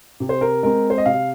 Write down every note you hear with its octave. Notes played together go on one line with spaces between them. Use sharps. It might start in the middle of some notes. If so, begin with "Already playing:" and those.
C3
C5
A#4
G#3 C4 A#4
C5
D#5
C3 F5